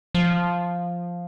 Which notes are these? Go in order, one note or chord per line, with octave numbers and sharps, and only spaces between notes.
F3